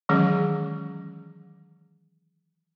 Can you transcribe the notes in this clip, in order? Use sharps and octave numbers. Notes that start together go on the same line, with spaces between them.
D#3 E3 F#3 G#3 C#4 G#4